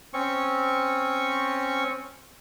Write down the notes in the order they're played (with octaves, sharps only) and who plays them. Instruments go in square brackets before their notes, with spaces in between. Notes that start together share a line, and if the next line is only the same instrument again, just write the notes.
[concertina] C4 C#4 C#6